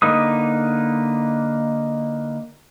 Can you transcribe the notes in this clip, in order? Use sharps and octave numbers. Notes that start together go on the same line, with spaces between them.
D3 A#3 D#4 B4 D#6